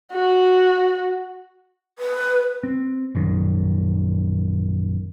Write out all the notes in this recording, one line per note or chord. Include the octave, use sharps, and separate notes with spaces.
F#4
B4
C4
A#1 F#2 D#3